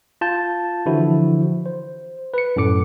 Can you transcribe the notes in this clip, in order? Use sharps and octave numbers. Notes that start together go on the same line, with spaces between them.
F4 A5 G6
D3 E3 F3 E4 F#4
C5
B4 C#7
F#2 A2 A4 D6 C#7